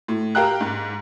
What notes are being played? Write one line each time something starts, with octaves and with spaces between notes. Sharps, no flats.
A2
G4 A#4 F5 G5 A#5 F#6
G#2